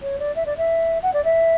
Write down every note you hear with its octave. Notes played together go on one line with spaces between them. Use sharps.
C#5
D5
E5
D5
E5
F#5
D5
E5